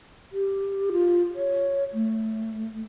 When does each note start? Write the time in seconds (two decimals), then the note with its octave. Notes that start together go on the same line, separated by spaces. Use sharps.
0.32 G4
0.92 F4
1.35 C#5
1.93 A3